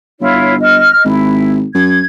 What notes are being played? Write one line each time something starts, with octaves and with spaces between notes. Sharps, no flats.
G1 E4 F4 C#5
D#5 F6
G#1 E4
F#2 G#6